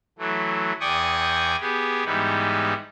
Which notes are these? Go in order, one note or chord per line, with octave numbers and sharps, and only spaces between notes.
E3 F#3 A3
E2 D5 G5 G#5 C#6 D#6
B3 G4 G#4
G#2 E3 G3 B3 D#4